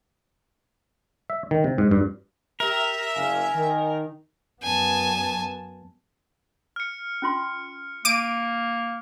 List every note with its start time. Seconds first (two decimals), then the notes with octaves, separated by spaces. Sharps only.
1.30 E5
1.51 D#3
1.64 C3
1.78 G#2
1.91 G2
2.60 G4 A#4 E5 A#5
3.15 F#1 F5 G#5
3.55 D#3
4.63 F#2 B3 G#5 A5
6.76 F6 C#7
7.22 C#4 F4 C6
8.05 A#3 D6 D7 D#7